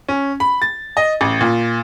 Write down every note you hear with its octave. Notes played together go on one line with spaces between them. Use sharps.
C#4
B5
A6
D#5
A1
A#2